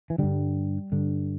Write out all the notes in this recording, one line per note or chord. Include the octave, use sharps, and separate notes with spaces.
E3
G2 D3 G3
G2 D3